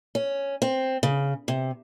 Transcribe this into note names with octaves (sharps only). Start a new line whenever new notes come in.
C#4
C4
C#3
C3